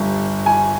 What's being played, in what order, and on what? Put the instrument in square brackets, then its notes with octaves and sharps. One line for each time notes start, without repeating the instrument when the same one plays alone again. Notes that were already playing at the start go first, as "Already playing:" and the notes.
Already playing: [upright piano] G1 G2 G3
G#5